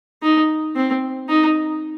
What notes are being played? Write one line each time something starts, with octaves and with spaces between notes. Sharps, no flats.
D#4
C4
D#4